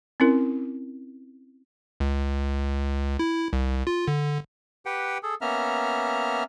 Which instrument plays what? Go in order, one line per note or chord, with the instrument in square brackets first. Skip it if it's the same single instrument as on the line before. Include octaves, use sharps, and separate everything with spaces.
[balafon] C4 C#4 E4 A#4
[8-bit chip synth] C#2
E4
C2
F4
D3
[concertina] G4 B4 F#5 G5
G#4 A4
A#3 B3 C#4 E5 A#5 F6